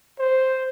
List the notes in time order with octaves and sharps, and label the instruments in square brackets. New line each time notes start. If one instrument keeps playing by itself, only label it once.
[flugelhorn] C5